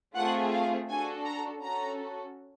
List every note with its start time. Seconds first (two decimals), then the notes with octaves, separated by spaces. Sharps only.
0.16 A3 C4 F4 G#4 F#5
0.52 F5
0.89 D4 F#4 A4 G#5
1.26 A#5
1.62 C#4 F#4 A4 A#5